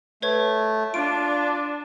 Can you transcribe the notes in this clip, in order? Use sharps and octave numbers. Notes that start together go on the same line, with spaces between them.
A3 B4 C#5 G#6
D4 F4 D7